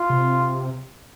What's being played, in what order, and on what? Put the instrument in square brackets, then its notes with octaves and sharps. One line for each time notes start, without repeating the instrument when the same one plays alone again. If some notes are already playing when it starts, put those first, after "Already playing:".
Already playing: [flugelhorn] F4
[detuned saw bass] C3